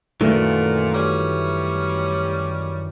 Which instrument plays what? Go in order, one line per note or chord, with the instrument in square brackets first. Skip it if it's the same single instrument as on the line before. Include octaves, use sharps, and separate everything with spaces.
[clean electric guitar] F#2 D#3 E3 [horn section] A#2 [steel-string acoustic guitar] A3 F#4
[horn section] G3 C#4